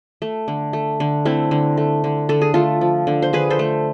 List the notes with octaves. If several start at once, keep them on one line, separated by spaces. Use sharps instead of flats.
A3
D3
A3
D3
A3 C4 E4
D3
A3
D3
D3 A4
G#4
A3 F4 A4
F3
D3
C5
D3 G#4 B4
A4 C5
A3